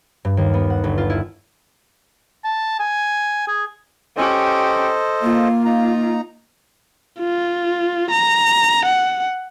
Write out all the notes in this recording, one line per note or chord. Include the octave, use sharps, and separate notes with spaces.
G2
D#2
B3
F#5
G1
F4
E4
A5
G#5
G#4
C#4 G4 A4 C5 D#5
A#3 F4
D#4 A#5
F4
A#5
F#5